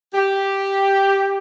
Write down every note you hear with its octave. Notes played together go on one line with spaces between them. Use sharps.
G4